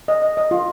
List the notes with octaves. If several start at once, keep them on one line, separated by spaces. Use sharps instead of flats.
D#5
D#5
D#5
F4